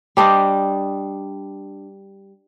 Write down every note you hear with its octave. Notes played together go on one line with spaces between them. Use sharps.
G3 D4 C5 D#5